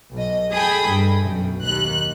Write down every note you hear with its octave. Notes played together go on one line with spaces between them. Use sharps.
B1 D#5
G#4 A4 G5 G#5 B5 D#6
G2
B1 F#2
D#2 F#6